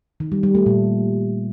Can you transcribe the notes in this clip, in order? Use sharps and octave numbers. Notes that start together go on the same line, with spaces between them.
D#3
G3
G3
A3
A#2